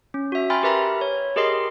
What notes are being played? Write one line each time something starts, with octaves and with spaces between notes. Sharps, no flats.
C#4
F#4 E5
G5 G#5 B5 C6 F6 A6
G4 A#4 B4 E5 A#5 B5
C#5
G4 G#4 A#4 D#5 C6 C7